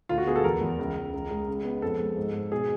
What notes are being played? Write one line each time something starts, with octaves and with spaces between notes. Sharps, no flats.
D2 F4
F#4
B3 G#4
A4
E2 A#4
E2
C#2
C#2
C#2
G#3
C#2
B3
F2 A4
G#3
G#2
G#2
B2 G#4